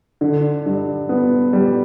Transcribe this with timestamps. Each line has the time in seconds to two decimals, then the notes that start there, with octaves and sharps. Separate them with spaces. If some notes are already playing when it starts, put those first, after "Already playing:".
0.21 D3
0.66 G2
1.09 B3
1.53 G3